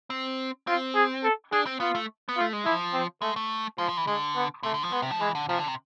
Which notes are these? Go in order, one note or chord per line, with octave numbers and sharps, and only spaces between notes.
C4
C4 F4
G#4
A4
D4 G#4
C4
B3 F4
A3
B3
A3 F4
G#3
F3 E4
C4
G#3 A3
A3
F3 G#3
F3
E3
D3 G#3
B3
C3 A3
D3
F3
G#3 B3
C3
F3
E3 G#3
D3
C3 F3
D3
C3